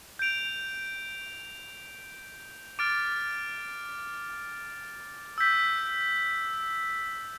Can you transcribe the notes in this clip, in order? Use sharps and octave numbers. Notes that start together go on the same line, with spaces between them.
G6 D7 F7
D6 F6 A6 D7
E6 G6 B6